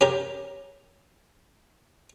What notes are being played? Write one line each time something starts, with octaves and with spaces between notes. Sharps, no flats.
C#4 G4 A#4